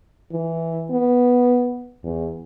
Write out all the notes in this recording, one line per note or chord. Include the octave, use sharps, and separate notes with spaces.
E3
B3
E2